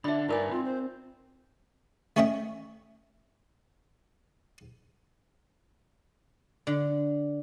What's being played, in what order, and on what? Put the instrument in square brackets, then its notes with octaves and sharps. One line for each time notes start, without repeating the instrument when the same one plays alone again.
[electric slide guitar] D3 D5 [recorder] D4 [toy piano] E5 B5
[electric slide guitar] G2 B4 A#5 [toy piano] D#4 A#4 G#5 [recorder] D5
[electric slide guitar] C4 [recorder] F4
[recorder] C5
[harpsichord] A3 C#4 C#5 D#5 E5 G5
[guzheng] D3